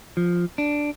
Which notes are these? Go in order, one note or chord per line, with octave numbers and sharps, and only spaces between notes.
F3
D4